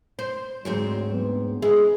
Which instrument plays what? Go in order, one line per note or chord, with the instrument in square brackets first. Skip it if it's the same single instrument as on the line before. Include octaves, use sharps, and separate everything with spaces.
[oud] C5
[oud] D2 G#2 C4 [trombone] F#3
[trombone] B3
[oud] G#3 E4 [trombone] G#4